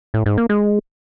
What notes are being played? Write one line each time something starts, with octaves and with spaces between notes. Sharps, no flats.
A2
G#2
A#3
G#3